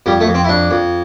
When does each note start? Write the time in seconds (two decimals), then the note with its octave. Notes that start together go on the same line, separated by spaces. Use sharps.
0.06 F2 G3
0.21 A3
0.28 F2
0.35 C4
0.44 E4
0.49 F2 D4
0.71 F2